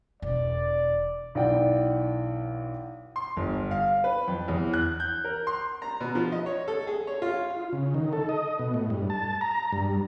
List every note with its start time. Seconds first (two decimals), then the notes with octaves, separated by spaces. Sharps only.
0.22 E1 D5
1.35 B1 E3 D5 F#5 G5
3.16 C6
3.37 G1
3.71 F5
4.04 B4
4.28 F2
4.48 E2
4.74 F#6
5.00 G6
5.24 A#4
5.47 C6
5.82 A#5
6.00 B2
6.15 F3
6.32 D#5
6.46 C#5
6.68 A4
6.87 G#4
7.07 C#5
7.22 F4
7.50 F4
7.73 C#3
7.94 D#3
8.13 A4
8.29 D#5
8.59 B2
8.74 A2
8.90 G2
9.10 A5
9.41 A#5
9.72 G2